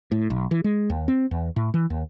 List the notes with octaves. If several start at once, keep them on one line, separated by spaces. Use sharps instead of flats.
A2
B1
E3
G#3
D#2
C4
E2
A2
E3
D#2